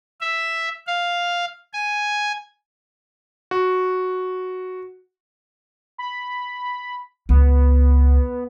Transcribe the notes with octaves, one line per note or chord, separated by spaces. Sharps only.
E5
F5
G#5
F#4
B5
C#2 B3